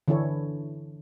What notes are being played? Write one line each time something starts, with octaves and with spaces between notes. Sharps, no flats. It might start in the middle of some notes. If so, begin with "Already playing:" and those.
D3 E3 D4 E4 A4 C#5